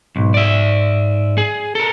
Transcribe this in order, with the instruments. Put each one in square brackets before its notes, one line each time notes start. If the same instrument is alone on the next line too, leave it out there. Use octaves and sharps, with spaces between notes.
[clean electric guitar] B1 [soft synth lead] G#2
[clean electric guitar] D5 E5
G#4
A4 A#4